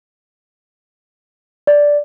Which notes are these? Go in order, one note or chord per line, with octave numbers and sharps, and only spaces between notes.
D5